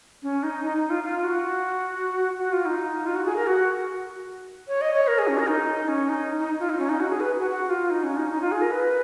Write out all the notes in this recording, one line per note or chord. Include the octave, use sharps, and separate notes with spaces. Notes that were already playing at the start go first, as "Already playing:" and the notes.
C#4
D#4
D#4
D#4
F4
F4
F#4
F#4
F4
D#4
F4
F#4
G#4
A#4
F#4
C#5
D#5
C#5
A#4
G#4
C#4
A#4
D#4
C#4
D#4
D#4
F4
D#4
C#4
D#4
F#4
G#4
B4
F#4
F#4
F4
D#4
C#4
D#4
D#4
F4
G#4
A#4
B4